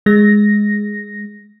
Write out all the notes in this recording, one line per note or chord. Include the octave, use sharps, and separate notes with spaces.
G#3 A#6